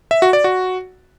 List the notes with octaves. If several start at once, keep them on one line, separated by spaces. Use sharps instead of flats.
E5
F#4
D5
F#4